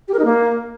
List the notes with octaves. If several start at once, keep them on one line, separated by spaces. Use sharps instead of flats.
G4
A#4
D#4
A#3